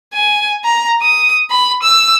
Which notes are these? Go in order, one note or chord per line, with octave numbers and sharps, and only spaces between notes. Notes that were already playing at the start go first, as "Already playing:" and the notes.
G#5
A#5
D#6
B5
E6